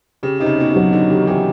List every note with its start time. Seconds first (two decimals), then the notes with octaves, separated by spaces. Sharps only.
0.23 C#3 G4
0.40 C3 D#4
0.46 C#3
0.58 B2 D#4
0.69 C3
0.75 F#3
0.92 D3 D#4
1.10 D#3 G4
1.27 E3 G4